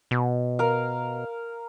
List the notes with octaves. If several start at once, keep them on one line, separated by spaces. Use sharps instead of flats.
B2
A#4 F5